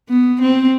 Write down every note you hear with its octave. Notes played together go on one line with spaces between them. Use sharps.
B3
C4